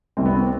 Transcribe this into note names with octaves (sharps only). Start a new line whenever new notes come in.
C2 C4
B3
C4